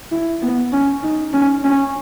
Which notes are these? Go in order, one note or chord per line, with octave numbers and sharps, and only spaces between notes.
E4
B3
C#4
D#4
C#4
C#4